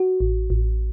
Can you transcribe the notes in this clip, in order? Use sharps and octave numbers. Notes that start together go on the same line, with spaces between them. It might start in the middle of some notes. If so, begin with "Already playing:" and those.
Already playing: F#4
A1
A1